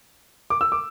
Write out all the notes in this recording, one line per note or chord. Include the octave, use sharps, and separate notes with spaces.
D6
E6
D6